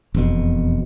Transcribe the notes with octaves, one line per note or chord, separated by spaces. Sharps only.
E1 F2 B2